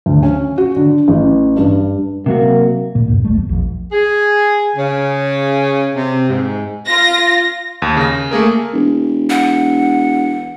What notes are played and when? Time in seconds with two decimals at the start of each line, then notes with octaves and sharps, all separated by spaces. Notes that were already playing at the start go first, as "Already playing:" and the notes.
0.06 D2
0.23 C#4
0.58 F#4
0.76 D3
1.08 A1
1.57 G2
2.26 C3 F#3 A#3 F#4
2.95 A#2 A#3
3.08 E2 G2 B2
3.25 A#1 G3 A3
3.37 E2
3.49 A#1
3.92 G#4
4.77 C#3
5.95 C3
6.29 G#2
6.87 F4 A#6
7.82 D#2
7.97 C#3 A#6
8.31 A3 A#3 G#4 A#4
8.73 E1
9.30 F#5